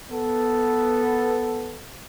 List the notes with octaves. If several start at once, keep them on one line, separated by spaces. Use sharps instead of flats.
B3 A4